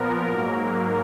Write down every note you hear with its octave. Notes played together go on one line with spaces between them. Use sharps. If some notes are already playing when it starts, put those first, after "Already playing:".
Already playing: A#2 F3 B3 A#4
G#2 F#3 A#3